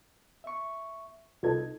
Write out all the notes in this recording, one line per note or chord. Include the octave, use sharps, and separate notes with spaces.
E5 C#6
C2 D#4 F4 A4 G#6